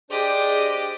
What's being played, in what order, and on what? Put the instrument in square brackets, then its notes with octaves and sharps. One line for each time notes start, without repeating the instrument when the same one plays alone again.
[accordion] D4 C5 D5 [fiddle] G4 D#5 [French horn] G#4